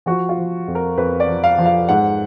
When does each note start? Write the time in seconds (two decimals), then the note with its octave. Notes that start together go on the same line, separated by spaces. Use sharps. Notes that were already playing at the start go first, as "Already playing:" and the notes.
0.06 F3 F#4
0.29 F4
0.38 F3
0.68 F2
0.75 A#4
0.98 F2 B4
1.20 D5
1.27 F3
1.44 F5
1.58 F3
1.65 F5
1.88 G#2 F#5